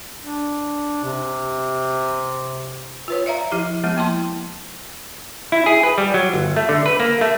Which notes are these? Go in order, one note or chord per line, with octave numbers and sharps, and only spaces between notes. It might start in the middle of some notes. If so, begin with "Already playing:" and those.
D4
C3
F4 B4 C#5
D5 E5 F5 A#5
F3 E4 G4
F3 G#3 B3 E4
A#3 E4 A5 C6
E4
G#4
B4
G3
F#3
G1
A3
D3
B4
A#3
A3